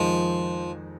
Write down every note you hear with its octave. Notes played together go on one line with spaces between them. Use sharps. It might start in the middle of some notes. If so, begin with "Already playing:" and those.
Already playing: F2 D#3 F3 G#3